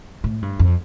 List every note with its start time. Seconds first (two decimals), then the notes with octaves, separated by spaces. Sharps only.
0.24 A2
0.42 G2
0.59 F2